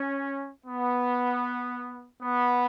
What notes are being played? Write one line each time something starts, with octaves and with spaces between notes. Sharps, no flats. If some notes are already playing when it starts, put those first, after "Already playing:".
Already playing: C#4
B3
B3